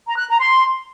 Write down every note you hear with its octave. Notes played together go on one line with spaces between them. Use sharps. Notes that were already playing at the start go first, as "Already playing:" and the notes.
A#5
F#6
A#5
C6